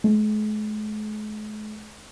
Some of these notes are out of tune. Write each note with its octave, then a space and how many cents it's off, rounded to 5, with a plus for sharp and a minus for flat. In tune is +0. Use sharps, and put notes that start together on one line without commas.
G#3 +45